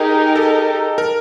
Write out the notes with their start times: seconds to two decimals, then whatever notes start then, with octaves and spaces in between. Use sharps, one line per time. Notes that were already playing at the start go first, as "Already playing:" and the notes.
Already playing: D#4 G4 G#4 A#4
0.36 A4
0.98 A#4